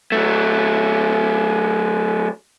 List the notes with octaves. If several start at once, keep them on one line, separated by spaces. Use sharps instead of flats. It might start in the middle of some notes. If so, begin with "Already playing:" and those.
F#3 A3